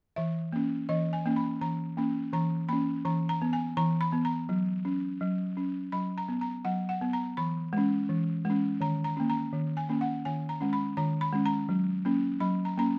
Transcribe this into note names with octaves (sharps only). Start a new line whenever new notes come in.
E3 E5
A#3 C#4
E3 D#5
G#5
A#3 C#4
B5
E3 A#5
A#3 C#4
E3 A#5
A#3 C#4 B5
E3 A#5
A#5
B3
G#5
E3 A#5
B5
B3
A#5
F#3
C#4
F#3
C#4
F#3 B5
A#5
B3
A#5
F#3 F#5
F#5
B3
A#5
E3 B5
G#3 C#4
E3
G#3 C#4
D#3 A#5
A#5
A#3 C#4
A#5
D#3
G#5
A#3 C#4
F#5
D#3 G#5
A#5
G#3 C#4
B5
D#3 A#5
B5
G#3 C#4
A#5
F#3
A#3 C#4
F#3 B5
A#5
A#3 C#4 A#5